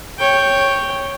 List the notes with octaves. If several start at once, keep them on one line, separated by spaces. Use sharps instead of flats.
C#5 G5